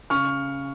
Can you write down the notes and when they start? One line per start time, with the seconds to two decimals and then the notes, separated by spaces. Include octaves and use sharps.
0.10 C#3 C#6 F6